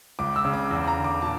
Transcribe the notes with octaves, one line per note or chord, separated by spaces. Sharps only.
C#2 D6
E6
C#3
D6
E2
A#5
D3
D6
A#2 A5